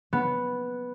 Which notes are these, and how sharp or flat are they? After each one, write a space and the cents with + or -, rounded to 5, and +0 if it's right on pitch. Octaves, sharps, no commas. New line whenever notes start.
B3 -5